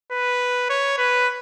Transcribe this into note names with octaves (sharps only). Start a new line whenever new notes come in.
B4
C#5
B4